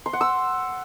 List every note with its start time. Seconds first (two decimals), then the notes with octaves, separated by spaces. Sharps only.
0.06 C6
0.13 F#5
0.21 E6